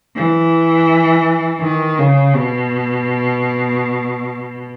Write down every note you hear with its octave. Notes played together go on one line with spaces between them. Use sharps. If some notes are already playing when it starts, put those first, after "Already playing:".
E3
D#3
C#3
B2